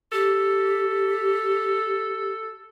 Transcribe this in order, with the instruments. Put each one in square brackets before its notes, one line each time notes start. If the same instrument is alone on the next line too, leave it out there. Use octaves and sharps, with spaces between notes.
[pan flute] G4 [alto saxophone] A4